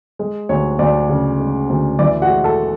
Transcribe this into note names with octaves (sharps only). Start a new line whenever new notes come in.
G#3
D2 C#5
D2 D5
C#3
G#3
D2
E3 D5
F#4 F#5
G#3
A4 A5